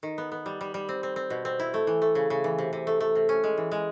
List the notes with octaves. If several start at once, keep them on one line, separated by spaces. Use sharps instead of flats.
D#3
B3
B3
G3
G3
G3
C4
C4
C4
B2
C4
E4
A3
E3
A3
C#3
C#3
E3
C3
C3
A3
A3
C3
C#4
G#3
E3
G#3